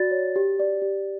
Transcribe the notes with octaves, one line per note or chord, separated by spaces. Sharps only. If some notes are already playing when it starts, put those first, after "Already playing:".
Already playing: F#4 D5 A6
C#5
G4
D5
G4